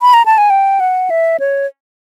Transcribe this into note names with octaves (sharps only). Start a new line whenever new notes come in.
B5
A#5
A5
G#5
G5
F#5
E5
C#5